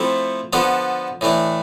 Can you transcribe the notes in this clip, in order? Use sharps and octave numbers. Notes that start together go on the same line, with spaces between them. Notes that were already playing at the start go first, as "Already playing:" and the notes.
Already playing: F3 A3 C4 E4 A4
D3 F3 B3 D4 A4
A2 E3 A3 D4